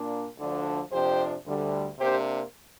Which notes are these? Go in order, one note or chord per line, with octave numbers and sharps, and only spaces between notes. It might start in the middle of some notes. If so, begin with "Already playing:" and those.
Already playing: A#2 A#3 D4
D2 D3 F3 D4
F2 C3 F3 D4 G4 C5
D2 D3 G3
C3 A#3 D4 G4 C5